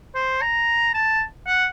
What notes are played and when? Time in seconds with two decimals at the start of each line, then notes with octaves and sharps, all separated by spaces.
0.15 C5
0.42 A#5
0.95 A5
1.47 F#5